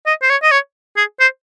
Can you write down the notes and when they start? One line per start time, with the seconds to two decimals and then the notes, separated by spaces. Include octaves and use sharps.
0.06 D#5
0.22 C5
0.29 C#5
0.43 D#5
0.51 C#5
0.96 G#4
1.20 C5